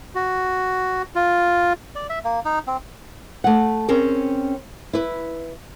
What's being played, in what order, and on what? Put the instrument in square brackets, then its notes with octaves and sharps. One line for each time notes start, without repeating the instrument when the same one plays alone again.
[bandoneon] F#4
F4
[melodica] D5
E5
A#3
D#4
C4
[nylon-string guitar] A3 F#5
C4 C#4 G#4 A#4
E4 B4